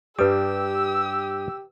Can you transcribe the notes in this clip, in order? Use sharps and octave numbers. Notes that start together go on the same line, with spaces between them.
G2 G3 G4 B4 D#6 E6